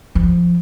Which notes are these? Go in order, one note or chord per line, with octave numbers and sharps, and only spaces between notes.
F3